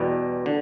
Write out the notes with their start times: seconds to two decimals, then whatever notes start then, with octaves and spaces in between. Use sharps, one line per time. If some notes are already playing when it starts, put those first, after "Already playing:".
Already playing: E2 B2 G3
0.46 D3